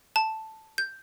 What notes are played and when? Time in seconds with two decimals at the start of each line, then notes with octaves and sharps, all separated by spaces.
0.16 A5
0.78 G6